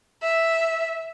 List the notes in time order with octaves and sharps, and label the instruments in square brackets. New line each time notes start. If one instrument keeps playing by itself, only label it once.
[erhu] E5